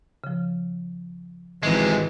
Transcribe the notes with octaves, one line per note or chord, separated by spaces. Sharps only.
C#3 F3
G#1 C3 D#3 E3 G#3